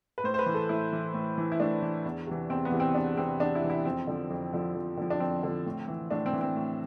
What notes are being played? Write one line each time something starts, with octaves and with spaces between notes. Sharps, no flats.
B4
A2 C5
C5
B4
E3
A4
A2 E4
E3
A2
E3
E4
A2 D4
E3
E2
C3 E3
E2 C4
B3
C3 E3
C4
E2 D4
C3 E3 C4
E2 D4
E4
C3 E3
E4
F2 C4
D3 F3
F2
D3 F3
F2
D3 F3
D4
F2 C4
D3 F3
A2
E3
A2 D4
C4
E3
C4
A2